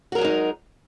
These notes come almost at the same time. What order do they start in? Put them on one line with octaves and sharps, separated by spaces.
F#4 A#4 F#3 G#3 D#4